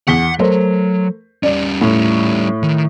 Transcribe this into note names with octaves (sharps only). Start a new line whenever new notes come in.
E2 F#5 B6 G7
F#3 A3 A#4 C5
G3 C#4 D5
A2
D#3